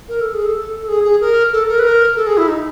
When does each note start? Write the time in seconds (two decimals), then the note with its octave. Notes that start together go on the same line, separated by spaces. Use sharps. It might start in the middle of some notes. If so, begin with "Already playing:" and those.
0.09 A#4
0.21 A4
0.34 G#4
0.46 A4
0.81 A4
0.89 G#4
1.05 G#4
1.21 A#4
1.52 A4
1.69 A#4
1.79 B4
1.84 A#4
2.16 A4
2.27 G#4
2.37 E4
2.48 D#4